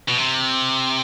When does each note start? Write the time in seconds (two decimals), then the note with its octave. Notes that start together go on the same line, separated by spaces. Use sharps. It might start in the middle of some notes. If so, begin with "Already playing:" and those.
0.08 B2
0.18 C3